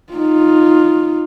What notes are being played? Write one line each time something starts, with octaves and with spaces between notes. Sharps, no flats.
D#4 F4